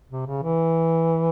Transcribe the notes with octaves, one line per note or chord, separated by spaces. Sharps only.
C3
C#3
E3